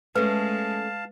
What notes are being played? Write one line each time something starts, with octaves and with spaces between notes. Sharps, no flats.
G#3 A3 C#4 B4 F5 A5